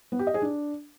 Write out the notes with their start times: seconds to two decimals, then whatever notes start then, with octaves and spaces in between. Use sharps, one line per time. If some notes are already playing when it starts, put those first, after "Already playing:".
0.12 B3
0.19 G4
0.27 D#5
0.34 G#4
0.42 D4